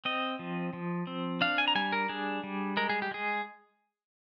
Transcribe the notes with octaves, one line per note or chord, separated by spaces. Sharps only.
C4 D#5
F3
F3
C4
D4 F5
G#5
A#5
G3 G#5
A#4
D4 G#4
G3
G#3 A#4
G#4
G4
G#3 G#4